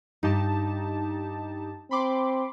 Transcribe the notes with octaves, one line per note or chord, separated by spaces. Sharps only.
G2 D#4 G4 A5
C4 B5 C6 D6